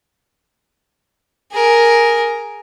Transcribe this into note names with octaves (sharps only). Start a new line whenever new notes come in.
G#4 A#4